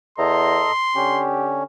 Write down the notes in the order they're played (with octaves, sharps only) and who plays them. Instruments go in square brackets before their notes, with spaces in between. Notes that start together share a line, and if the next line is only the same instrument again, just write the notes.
[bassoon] E2 [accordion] A4 D#5 A#5 [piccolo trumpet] C6
[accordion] D3 C#4 [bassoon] G4